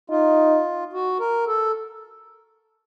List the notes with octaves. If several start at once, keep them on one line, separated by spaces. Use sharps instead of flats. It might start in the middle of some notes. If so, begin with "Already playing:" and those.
D#4 F4
F#4
A#4
A4